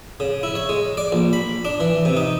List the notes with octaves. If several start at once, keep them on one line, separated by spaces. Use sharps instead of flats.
C#3
E4
C#5
G#3
D5
A#1
B5
D4
E3
C3
D#4